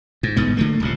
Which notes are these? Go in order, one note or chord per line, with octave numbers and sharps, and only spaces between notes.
G#2
G1 G#2 B3
D3 A3 A#3
D#1 C#2 C3